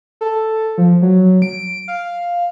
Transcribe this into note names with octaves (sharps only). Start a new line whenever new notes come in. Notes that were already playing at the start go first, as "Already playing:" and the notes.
A4
F3
F#3
D7
F5